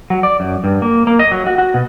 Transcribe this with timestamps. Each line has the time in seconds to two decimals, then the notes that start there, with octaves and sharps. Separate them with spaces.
0.10 F#3
0.23 D5
0.40 F#2
0.64 G2
0.82 A#3
1.07 A#3
1.19 D#5
1.31 F#3
1.47 F#4
1.58 F#4
1.74 B2